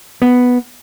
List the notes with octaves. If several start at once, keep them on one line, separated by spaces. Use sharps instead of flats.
B3